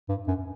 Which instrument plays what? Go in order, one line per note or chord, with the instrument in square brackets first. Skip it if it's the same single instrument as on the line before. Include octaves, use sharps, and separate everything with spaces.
[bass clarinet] G2
F#2